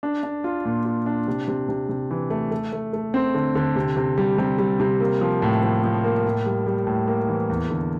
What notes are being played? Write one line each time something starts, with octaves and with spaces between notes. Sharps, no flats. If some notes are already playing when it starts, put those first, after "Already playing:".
D4
D4
F4
A#2
F4
D4
C3
C3
C3
C3
E3
A3
A3
A3
A3
C4
D3
D3
C3
C3
G3
C3
G3
C3
A#3
F3
A2
F3
F3
A#3
A2
G3
G3
A2
A#3
E3
E2
D3